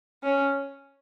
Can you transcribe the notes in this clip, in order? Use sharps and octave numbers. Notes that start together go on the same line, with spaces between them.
C#4